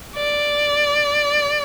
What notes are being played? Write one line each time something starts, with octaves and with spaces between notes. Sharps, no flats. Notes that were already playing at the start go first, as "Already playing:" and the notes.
D5